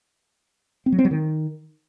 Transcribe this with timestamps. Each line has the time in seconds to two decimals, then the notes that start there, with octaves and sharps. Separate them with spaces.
0.86 C4
0.92 F#3
0.99 C4
1.05 F#3
1.11 D#3